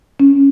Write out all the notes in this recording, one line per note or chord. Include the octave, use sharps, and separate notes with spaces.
C#4